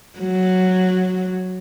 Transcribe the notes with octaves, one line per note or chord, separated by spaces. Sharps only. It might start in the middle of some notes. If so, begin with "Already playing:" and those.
F#3